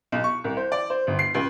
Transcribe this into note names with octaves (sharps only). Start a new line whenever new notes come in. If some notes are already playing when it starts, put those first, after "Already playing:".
B1
C#6
C2
C5
D5
C5
G1
C7
C#2